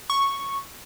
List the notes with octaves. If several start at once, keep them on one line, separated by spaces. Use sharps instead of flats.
C#6